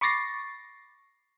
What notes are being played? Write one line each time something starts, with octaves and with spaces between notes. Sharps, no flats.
B5 C#6 D6 A6 A#6 C7